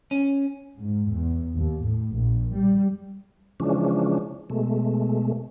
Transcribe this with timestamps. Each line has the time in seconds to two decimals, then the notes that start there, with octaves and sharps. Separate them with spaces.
0.11 C#4
0.78 G#2
1.13 E2
1.55 D#2
1.83 A2
2.16 A#1
2.56 G3
3.60 C#3 E3 F3 G#3 C#4 D4
4.50 B2 G#3 A3